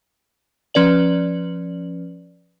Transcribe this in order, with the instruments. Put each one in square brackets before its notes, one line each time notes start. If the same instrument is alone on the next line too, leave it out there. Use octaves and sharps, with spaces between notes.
[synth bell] F3 C#4 B4 D5 F#7